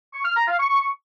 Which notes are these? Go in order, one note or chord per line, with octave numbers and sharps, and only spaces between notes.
C#6
F6
A#5
F5
C#6